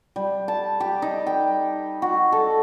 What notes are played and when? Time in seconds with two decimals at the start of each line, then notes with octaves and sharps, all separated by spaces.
0.16 G3
0.48 A5
0.80 G4
1.02 D#4
1.26 G5
2.02 F#4
2.32 A4